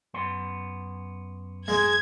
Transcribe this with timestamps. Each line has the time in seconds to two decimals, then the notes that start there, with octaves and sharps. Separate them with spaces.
0.14 F#2 B3 C6
1.68 G#3 G#6